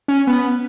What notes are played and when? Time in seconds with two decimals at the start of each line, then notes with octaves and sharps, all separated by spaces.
0.08 C#4
0.27 B3